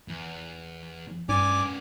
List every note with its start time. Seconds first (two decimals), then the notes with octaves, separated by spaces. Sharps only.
0.08 E2
1.29 G2 B3 C#4 D5 G#5 D6